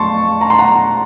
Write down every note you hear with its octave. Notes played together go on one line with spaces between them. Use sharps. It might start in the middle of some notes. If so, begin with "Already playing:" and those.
Already playing: F2 A3 A5 C6 C#6
A#5
C6
F#5 A#5